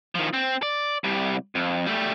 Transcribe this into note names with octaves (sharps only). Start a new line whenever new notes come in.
D#3 F3
C4
D5
C2 G3
F2
G3 A3